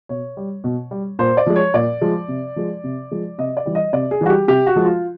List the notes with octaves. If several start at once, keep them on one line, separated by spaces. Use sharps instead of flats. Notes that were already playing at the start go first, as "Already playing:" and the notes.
B2 C#5
G3
B2
G3
A#2 C5
D5
F3 G#3
C#5
A#2 D5
F3 G#3
C3
F3 G#3
C3
F3 G#3
C3 D#5
D5
E3 G3
D#5
C3 D5
G#4
E3 G3 F#4
G4
C3 G4
F#4
F3 G#3
F4